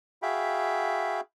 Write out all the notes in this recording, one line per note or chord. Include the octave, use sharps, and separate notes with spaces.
F#4 G#4 E5 F5 G5 B5